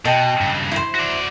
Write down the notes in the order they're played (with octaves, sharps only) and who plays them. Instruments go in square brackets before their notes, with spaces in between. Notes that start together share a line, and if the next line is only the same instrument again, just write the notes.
[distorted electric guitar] B2 [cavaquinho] D#5 G5 A5
[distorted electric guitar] G2 C#3
[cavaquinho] E4 C5
[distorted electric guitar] F#4 D5